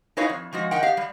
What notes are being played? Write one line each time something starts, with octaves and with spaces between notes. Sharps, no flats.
D#4 E4 F#4 B4 C#5 F5
F2
F3 G#3 F#4
A#4 D#5 F#5 G5
G4 F5
G3